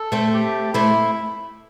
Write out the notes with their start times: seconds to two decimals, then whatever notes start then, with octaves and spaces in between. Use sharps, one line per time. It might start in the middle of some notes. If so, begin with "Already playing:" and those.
Already playing: A4
0.12 A3 C4
0.34 G4
0.74 A3 C4 E4